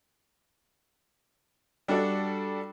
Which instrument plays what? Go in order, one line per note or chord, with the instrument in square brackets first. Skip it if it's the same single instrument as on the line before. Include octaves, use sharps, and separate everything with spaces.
[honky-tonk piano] G3 D4 F#4 A4 D5